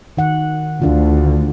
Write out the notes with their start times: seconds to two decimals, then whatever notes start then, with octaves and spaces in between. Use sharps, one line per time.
0.17 D#3 F#5
0.82 D2 D4 F4